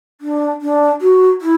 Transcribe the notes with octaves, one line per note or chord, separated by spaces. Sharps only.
D4
D4
F#4
E4